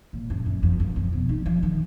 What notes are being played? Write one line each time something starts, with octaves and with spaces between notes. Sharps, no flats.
A#2
F#2
F#2
F2
F#2
F2
B2
D#3
F3
D#3